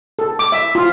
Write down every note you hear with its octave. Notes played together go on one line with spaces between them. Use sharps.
A4
D6
E5
F4